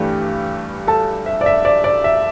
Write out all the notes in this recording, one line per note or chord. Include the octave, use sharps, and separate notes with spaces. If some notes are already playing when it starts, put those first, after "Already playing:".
Already playing: G2 E3 A3 D4 G4
A4 A5
E5
D5
E5
D5
D5
E5